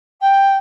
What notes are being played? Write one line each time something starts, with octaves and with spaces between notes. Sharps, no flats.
G5